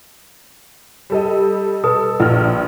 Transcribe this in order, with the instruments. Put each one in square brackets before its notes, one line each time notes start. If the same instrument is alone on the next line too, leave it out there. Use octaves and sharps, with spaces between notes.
[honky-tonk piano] G3 A4 D#5
[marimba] B2 [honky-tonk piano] A4
[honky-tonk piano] A#1 F6